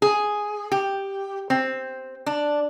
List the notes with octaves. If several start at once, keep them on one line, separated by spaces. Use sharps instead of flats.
G#4
G4
C4
D4